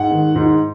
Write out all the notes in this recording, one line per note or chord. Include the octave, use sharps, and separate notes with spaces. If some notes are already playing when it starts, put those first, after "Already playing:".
Already playing: G#2 F#5
D#3
G#2